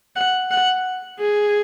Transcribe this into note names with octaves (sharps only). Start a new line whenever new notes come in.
F#5
F#5
G#4